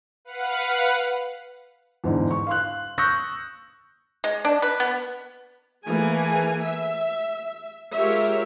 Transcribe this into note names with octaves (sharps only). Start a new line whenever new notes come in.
B4 F5 F#5
E2 G#2 D3
C#6
F5 C6 F#6
C#6 D#6 E6 F#6 G6 A#6
G#3
D4
B4
B3
E3 A3 A#3 G#4 G#5
E5
G#3 F4 G4 A#4 C#5 E5